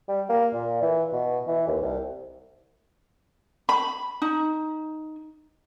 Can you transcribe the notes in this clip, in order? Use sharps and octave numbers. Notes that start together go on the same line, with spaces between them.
G3
A#3
A#2
E3
B2
E3
D#2
C2
B5
D#4